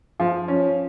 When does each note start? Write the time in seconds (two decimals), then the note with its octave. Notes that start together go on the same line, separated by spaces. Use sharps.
0.20 F3
0.48 C#4